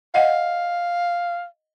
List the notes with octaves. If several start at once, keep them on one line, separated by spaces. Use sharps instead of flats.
D#5 F5 F#5